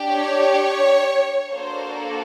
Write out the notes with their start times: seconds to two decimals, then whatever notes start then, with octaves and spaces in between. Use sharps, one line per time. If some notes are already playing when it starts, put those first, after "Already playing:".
Already playing: D4 G4
0.12 C#5
1.52 A#3 D4 F#4 A4 C5